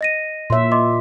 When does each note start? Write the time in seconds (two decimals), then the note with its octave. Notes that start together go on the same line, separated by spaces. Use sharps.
0.01 D#5 A#6 D#7
0.50 A#2 C#5 E5 C6
0.72 D#5 C6 D6